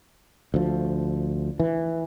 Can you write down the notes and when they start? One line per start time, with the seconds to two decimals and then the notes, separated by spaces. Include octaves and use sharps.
0.54 D2 F3
1.60 E3